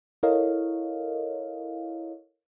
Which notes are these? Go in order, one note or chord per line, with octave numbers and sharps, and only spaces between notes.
E4 A4 A#4 C#5 D#5 F5